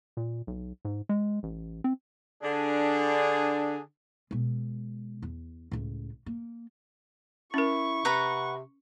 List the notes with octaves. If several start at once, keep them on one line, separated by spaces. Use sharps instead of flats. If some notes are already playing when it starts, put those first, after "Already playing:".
A#2
B1
G#2
G#3
A1
C4
D3 D4 G#4
B2 G#3
E2
C#2 A2
A#3
C#4 E4 A#4 C#6
C3 B4 F#5 A#5